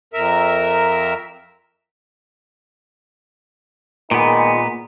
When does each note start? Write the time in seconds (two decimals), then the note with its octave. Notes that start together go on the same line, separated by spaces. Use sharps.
0.13 F2 A#4 E5
4.11 A#2 D#3 G#3 B3 D#4